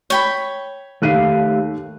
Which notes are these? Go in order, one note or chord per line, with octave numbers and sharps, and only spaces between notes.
C#5 G5 B5
D#2 A3 G4 F5 F#6 D#7